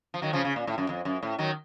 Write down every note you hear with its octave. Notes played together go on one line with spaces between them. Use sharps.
F3
D#3 F#3
C#3 F3
C#3
A#2
A2
F#2
F2
F#2
A2
D#3 F#3